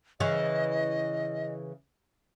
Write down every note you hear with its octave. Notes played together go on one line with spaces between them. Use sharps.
C#3 E3 D#5